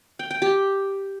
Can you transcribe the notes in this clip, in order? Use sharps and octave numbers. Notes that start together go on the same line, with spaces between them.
G5
G5
G4